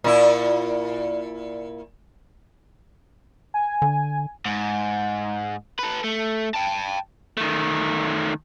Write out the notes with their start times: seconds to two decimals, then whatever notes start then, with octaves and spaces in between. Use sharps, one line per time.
0.04 A#2 E4
3.54 G#5
3.82 D3
4.46 G#2
5.79 A4 B4
6.04 A3
6.54 G5 A5
7.37 D#3 A3